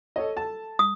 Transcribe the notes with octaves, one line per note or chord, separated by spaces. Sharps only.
A4 C#5 D#5
A4 A5
D#6